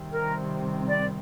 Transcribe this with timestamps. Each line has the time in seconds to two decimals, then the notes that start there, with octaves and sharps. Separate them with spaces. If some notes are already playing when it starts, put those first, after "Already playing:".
Already playing: C3 D#3 G3 C4
0.11 A#4
0.87 D5